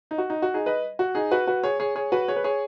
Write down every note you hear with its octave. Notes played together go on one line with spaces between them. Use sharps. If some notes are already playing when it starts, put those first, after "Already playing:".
D#4
F#4
D#4
F#4
D#4 G#4
B4 D#5
F#4
D#4 G#4
F#4 B4
F#4 B4
G#4 C#5
G#4 C#5
G#4 C#5
F#4 B4
G#4 C#5
B4
G#4 C#5